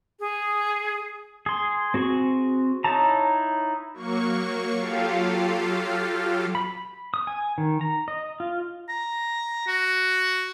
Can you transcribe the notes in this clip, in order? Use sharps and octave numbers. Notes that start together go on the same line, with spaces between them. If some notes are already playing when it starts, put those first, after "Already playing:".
G#4
G#4 C6
C4 F#4 G#4 C#6
D#4 E4 C#5 A5 A#5
F#3 A#3 C#6
F#3 F4 G4 A4 F5
B5
D#6
G#5
D#3
A#5
D#5
F4
A#5
F#4